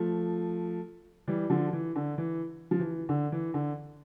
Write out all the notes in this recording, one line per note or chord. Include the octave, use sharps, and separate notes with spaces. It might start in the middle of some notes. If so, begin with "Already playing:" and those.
Already playing: F3 A3
E3 G3
D3 F3
E3
D3
E3
F3
E3
D3
E3
D3